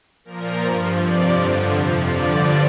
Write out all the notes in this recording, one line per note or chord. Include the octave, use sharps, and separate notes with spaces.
A#2 F3 A#4
G2 F3
F2 C3 F3 D5
G2 D3 F3
F2 C3 F3
G2 D3 F3 D5